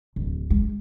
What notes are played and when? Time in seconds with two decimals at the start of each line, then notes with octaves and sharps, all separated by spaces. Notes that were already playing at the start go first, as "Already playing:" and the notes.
0.16 D1
0.50 G#3